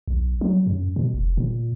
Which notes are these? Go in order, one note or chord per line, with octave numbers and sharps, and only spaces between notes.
B1
F#3
F#2
B2
F1
A#2